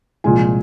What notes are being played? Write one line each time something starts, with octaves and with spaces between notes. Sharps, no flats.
C2 A#2 F3 G#3 G#5